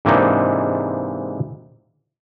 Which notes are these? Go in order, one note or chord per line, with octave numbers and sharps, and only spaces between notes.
G#2 C3 E3 A#3 D4 D#4